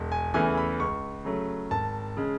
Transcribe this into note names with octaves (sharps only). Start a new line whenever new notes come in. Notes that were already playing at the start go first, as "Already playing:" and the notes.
Already playing: E1
G#5
E2 C#3 E3 A3 G#5
B5
C#2 C#6
C#3 F#3 A3
G#1 A5
C#3 G#3